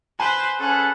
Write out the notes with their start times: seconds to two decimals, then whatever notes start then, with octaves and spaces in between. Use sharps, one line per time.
0.20 B4 C5 G#5
0.59 C#4 G#4 A4 B4 F#5